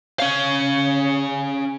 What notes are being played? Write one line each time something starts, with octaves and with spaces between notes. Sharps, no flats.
C#4 F5